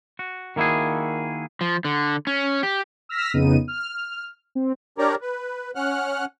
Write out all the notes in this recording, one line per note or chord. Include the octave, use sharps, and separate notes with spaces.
F#4
D#3 A#3 E4 F#4 G#4
F3
D3
C#4
G4
E6 F6 A#6 B6
F2 C#3 B3 D#4 D#7
F6
C4
D4 G4 A#4 C#5 D5 A#5
B4
C#4 F#5 F6 F#6